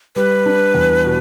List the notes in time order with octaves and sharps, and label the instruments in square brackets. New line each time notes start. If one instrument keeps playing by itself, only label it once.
[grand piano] G3 [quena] B4
[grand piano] D4
E2
B2